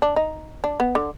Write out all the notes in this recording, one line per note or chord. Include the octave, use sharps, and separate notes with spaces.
D4
D#4
D4
B3
D3